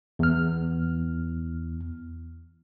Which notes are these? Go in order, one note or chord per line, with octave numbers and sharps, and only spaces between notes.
E2 F6